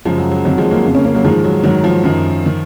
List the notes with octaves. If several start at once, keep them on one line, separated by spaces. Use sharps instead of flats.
F#2 C#3 F3 G#3
F#3
F#3
F2 D#3 F#3
F3 G#3
F#3 A#3
F2 C#3
A#3 C#4
A#3 C#4
F#3 A#3
G#2 D#3 F3 G#3
F#3
G#2 D#3 F#3
F3
F#2 D#3
D#3